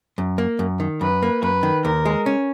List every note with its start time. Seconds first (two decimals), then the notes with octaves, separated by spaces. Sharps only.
0.18 F#2
0.38 A#3
0.59 F#2
0.80 D#3
1.01 F#2 B4
1.23 A#3
1.43 F#2 B4
1.63 D#3
1.84 D#2 A#4
2.05 G#3
2.26 C#4